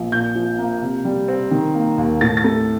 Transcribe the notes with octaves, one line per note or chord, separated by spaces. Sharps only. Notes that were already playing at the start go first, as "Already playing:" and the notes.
Already playing: A#1 F3
A#2 G6
F3
A#3
C3
G3
C4
D#3
A#3
D#2
A2 A6
A6
A3